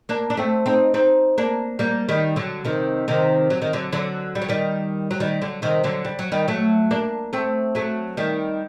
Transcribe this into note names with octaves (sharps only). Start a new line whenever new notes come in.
A#3 D4
D4
A3 C4
C4 D#4
C4 D#4
A#3 D4
G3 A#3
D#3 G3
D3 F#3
C3 D#3
C3 D#3
F#3
D#3
D3 F#3
D3 F#3
G3
F#3
D#3 G3
F#3
D#3 G3
D3 F#3
C3 D#3
D3 F#3
G3
F#3
D#3 G3
F#3 A3
A#3 D4
A3 C4
F#3 A3
D#3 G3